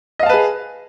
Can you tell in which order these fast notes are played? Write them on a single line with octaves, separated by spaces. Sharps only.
D#5 F5 A5 B4 G#4